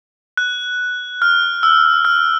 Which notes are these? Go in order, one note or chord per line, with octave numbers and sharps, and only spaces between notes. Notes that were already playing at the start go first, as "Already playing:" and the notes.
F#6
F6
E6
F6